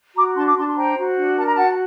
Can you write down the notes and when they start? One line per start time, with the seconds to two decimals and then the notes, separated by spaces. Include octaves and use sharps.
0.16 F#4 A#5 D6
0.36 D4 A5 C6
0.47 D6
0.56 D4 A5 C6
0.68 C6
0.76 C5 G5 A#5
0.97 F#4
1.17 D4
1.36 A#4 A5
1.45 A#5
1.54 F#4 F#5 A5